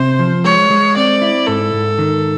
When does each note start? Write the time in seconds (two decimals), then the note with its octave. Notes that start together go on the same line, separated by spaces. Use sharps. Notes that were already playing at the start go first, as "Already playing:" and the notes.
Already playing: C3 C5
0.19 F3
0.45 G#3 C#5
0.70 G#3
0.97 C4 D5
1.21 E4
1.47 G#2 A4
1.74 G#2
1.99 D#3